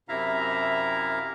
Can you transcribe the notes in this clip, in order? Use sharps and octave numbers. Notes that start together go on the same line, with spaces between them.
F#2 C3 E4 E5 F5 A#5